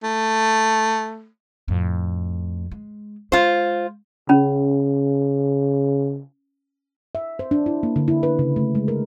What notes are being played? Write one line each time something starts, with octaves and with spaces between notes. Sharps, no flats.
A3
F2 A2
G#3
G#3 F4 C5
C#3 C#4 B5
E5
C5
D4
E4
A#3
D3
E4
B4
C#3
A3
G#3
A#4